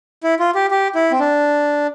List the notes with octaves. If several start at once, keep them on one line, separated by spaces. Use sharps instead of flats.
E4
F4
G4
G4
E4
C4
D4